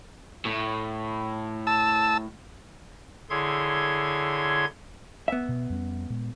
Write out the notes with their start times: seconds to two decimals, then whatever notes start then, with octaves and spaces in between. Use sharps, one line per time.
0.45 A2
1.67 A5 E6
3.30 D3 E4 G#4 C#5 C6 G#6
5.28 B3 E5
5.49 B2
5.69 F2 G3 C#4
6.10 A#2 G#3